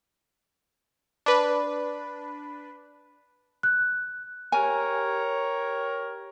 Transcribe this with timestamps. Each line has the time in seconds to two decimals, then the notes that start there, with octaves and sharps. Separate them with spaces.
1.26 D4 B4
3.63 F#6
4.52 G4 A#4 C#5 G#5